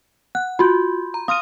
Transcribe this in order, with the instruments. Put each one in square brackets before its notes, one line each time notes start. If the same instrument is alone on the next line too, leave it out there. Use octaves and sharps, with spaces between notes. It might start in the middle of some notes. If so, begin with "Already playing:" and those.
[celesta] F#5 [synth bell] F#6
[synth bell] F4 F#4 [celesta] B5 C6 G6
[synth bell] A#5
[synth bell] F5 C6 F6 [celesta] D#6 D#7